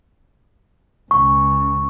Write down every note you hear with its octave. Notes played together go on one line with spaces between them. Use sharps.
C#2 C#3 C#6